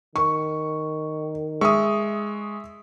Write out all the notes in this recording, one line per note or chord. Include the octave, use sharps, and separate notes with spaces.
D#3 C#6
G#3 E5 C#6 D#6